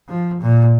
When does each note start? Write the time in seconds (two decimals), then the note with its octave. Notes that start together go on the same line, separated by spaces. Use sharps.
0.09 F3
0.41 A#2